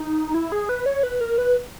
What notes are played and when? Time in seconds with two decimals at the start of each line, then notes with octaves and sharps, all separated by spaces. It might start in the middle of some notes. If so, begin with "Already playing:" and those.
Already playing: D#4
0.34 E4
0.52 G#4
0.69 B4
0.86 C#5
1.03 B4
1.21 A#4
1.38 B4